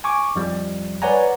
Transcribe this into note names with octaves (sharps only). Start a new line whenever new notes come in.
G#5 C#6 D6
F2 F3 G3
B4 C#5 D5 F#5 G#5 A#5